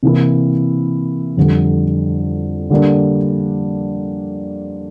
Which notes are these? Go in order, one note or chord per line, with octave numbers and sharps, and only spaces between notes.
C3 E3 A#3 E4
F2 D3 G3
D3 G3 A#3 D4